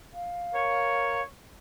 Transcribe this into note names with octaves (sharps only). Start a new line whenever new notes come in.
F5
A#4 C#5